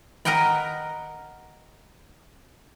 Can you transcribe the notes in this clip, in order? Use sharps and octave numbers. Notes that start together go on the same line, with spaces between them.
A#4 D#5 F#5 G5 B5